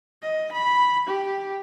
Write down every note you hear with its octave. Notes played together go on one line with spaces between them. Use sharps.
D#5
B5
G4